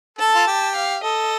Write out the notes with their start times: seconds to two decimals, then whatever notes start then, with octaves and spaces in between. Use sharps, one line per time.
0.19 A4 A5
0.35 F4
0.47 G4
0.76 F5
1.03 A4 D#5